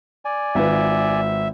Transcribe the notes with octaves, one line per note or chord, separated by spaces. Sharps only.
D5 G#5
G#1 F4 B4 E5